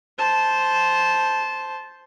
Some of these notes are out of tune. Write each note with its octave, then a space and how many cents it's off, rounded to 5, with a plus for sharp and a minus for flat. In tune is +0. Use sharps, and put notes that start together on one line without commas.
C5 +0 A5 -15